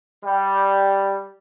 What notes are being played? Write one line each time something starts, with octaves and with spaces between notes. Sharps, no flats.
G3